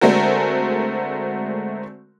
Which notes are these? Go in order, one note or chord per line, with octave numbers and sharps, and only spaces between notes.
D3 G#3 A3 C4 F#4 A#4